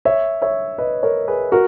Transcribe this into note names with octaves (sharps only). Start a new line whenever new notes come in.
C#5 E5
C#5 E5
B4 D#5
A#4 C#5
G#4 B4
F#4 A#4